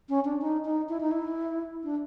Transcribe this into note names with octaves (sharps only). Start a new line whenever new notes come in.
C#4
D4
D#4
D#4
E4
D#4
E4
D4